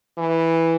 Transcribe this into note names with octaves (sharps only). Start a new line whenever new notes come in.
E3